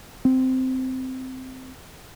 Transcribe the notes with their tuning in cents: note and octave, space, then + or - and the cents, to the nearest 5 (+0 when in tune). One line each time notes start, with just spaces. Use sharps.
C4 -10